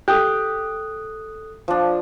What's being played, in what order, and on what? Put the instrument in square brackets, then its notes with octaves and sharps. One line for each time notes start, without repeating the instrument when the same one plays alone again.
[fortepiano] G4 [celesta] A4 D#6 F#6
[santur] F3 D4